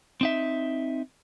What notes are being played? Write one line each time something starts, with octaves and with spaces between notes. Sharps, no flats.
C4 D#4 E5